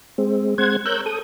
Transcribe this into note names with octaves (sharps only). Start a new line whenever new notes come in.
G#3 C4
G#3 C4 C5 F#5 G#6
A#4 C#5 E6 F#6 G6
A4 D#6